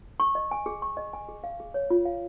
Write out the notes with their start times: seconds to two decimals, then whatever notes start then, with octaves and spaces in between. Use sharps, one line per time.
0.20 C#6
0.35 D#5
0.51 G#5
0.66 G#4
0.82 C#6
0.97 D#5
1.13 G#5
1.28 G#4
1.44 F5
1.60 G#4
1.74 C#5
1.90 F4
2.05 F5